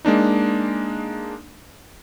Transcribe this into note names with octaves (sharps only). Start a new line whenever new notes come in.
G#3 A#3 D4 D#4